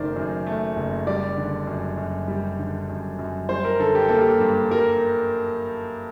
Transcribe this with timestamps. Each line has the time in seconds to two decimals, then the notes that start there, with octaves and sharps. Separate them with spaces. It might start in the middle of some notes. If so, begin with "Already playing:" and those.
Already playing: F#1 F#2 D#3 A3 A#4 C5 D5
0.16 F#2
0.47 A3
0.76 F#1
1.07 G3 D5
1.37 D3
1.67 F#2
1.98 F#2
2.28 G3
2.59 D3
2.89 F#2
3.19 F#2
3.49 G3 C5
3.65 A#4
3.80 D3 A4
3.95 G4
4.08 A#3 A4
4.21 G4
4.40 G2
4.71 G3 A#4